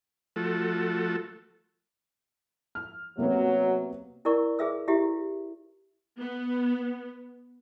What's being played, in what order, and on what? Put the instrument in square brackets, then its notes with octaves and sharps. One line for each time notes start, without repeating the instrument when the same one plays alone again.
[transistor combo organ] F3 A3 F#4 A4
[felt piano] F6
[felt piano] C3 A#3 B3 [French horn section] F#3
[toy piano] E4 A#4 D5 C#6
G#4 B4 E5 E6
E4 G4 E5
[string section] B3